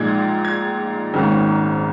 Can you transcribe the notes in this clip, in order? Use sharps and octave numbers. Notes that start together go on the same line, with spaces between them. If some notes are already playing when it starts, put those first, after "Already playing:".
Already playing: A#1 A#2 G#3 D#4 G#6
G#6
G#1 G#2 D#3 A#3 C#4